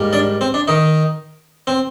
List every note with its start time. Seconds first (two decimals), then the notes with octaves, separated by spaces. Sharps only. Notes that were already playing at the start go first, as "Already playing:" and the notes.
Already playing: G#2 G3 A#3
0.13 D4 D5
0.41 C4
0.54 D4
0.68 D#3 D#4
1.67 C4